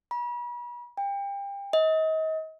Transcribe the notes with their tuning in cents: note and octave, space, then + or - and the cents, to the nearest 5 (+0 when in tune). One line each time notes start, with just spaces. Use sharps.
B5 -40
G5 +30
D#5 +35